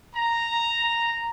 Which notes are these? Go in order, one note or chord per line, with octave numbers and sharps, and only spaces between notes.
A#5